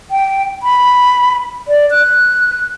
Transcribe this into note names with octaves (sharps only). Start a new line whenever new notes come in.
G5
B5
D5
F#6